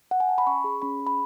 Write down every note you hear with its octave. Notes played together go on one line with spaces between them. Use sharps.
F#5
G#5
A5
B5
C#4 C#6
G#4
C#4 B5
G#4
B5